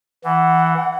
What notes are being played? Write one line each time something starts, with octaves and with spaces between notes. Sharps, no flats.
E3 F#5